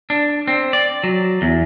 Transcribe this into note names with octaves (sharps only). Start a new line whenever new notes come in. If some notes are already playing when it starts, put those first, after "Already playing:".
D4
C4
D5
F#3
E2